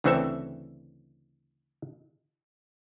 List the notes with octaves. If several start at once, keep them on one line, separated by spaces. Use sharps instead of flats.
D2 C#3 E3 C4 A4 E5